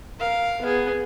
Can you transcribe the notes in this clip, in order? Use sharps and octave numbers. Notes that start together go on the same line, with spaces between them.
A#4 F5
B3 G#4